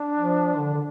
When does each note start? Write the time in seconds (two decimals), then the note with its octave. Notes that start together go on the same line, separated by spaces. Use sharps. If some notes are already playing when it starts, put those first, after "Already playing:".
Already playing: D4
0.17 F3
0.58 D3
0.74 D3